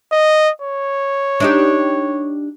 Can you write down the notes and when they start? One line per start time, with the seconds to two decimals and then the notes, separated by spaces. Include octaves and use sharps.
0.12 D#5
0.62 C#5
1.40 D4 D#4 G4